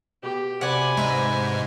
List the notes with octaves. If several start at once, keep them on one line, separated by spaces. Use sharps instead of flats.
B2 G4
C3 D5 F#5 G#5 B5
G#2 B4 E5 A#5